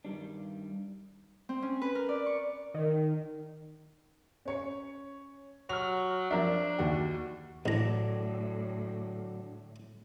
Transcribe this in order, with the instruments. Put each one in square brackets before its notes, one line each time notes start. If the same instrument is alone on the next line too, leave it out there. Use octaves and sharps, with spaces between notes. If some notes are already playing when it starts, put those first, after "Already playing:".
[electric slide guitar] G2 D#3 G3 D4
[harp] C4
C#4
B4
A#4
D5
C#6
[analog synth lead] D#3
[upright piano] C#4 C#5 C#7
[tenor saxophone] F#3 [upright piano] F6 F7
[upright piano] F3 A#4 E5 [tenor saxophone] D4
[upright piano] D#2 F#4 F#5
[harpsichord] A1 A#5 [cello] A2 [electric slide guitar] D3 F#3 D4